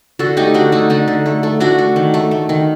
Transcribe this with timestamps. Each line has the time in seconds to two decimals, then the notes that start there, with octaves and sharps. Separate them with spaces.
0.19 D3 F#4 A4
0.37 A3 D#4 G4
0.54 D3 D4 F#4
0.72 A3 D#4
0.90 D3 D#4
1.08 D3
1.26 A3
1.43 A3
1.60 A3 D4 F#4
1.78 A3
1.96 D#3
2.14 A3
2.31 A3
2.49 D#3